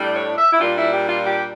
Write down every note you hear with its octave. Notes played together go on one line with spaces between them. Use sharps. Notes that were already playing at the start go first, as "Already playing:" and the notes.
Already playing: A2 G3 D4
C#5
E5
E4
A#2 G3 D4 F4
E4
G4
F4
G4